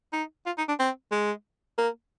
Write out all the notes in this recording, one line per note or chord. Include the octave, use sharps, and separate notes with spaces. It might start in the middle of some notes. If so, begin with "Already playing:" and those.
D#4
F4
D#4
D4
C4
G#3
A#3